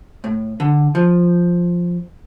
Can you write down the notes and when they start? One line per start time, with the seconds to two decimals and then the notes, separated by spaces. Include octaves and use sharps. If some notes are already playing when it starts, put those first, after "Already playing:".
0.24 A2
0.60 D3
0.95 F3